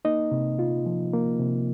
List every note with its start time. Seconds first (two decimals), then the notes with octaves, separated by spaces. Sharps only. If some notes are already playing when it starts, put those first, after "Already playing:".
0.05 A#3 D#4 D#5
0.32 C3
0.59 F4
0.86 F3
1.13 A#3
1.40 C3